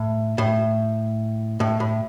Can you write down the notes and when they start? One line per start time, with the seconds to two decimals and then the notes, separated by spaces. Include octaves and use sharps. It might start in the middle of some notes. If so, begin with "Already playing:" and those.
Already playing: A2
0.38 A2
1.60 A2
1.80 A2